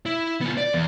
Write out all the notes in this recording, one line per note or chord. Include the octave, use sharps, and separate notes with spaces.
E4
B3 F4
D5
E2